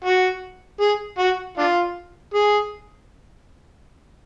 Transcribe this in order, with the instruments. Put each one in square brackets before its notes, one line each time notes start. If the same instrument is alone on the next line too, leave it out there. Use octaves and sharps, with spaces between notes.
[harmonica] F#4
G#4
F#4
D4 F4
G#4